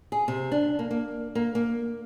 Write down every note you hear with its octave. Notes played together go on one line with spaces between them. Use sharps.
G#4
C3
D4
A#3
A#3
A#3
A#3